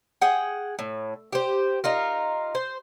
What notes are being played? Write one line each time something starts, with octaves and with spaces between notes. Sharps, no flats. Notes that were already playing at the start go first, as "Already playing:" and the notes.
G#4 F#5 G5
A2
G4 C5
D#4 F4 A#4
C5